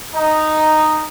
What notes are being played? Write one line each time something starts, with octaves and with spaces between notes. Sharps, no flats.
D#4